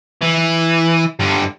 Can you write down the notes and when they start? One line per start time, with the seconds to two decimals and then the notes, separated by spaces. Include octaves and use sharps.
0.22 E3
1.20 G2 D3